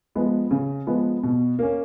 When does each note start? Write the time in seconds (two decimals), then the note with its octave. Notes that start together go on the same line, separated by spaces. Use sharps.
0.15 F3 G#3 B3
0.51 C#3
0.87 F3 G#3 B3
1.23 B2
1.59 A#3 C#4